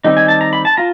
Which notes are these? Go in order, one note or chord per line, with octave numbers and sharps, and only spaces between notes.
D#3 G3 C4 D#4
G#5
A5
A#5
B5
A5
F4 A#5